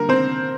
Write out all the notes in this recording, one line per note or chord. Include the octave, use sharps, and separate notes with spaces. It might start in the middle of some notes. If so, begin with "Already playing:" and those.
Already playing: D3 G3 A#3 A#4
C4 C5